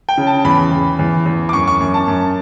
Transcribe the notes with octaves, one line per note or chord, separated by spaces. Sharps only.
G5
C#3
A5
E2 B5
E2
E2
E2
D6
F#2 C#6
C#6
F#2
A5
F#2